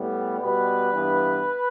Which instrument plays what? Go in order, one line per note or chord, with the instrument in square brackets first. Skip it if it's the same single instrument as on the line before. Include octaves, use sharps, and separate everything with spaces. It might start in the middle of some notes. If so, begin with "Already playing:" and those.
Already playing: [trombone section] A2 G3 B3
B2 G3 B3 B4
G2 E3 B3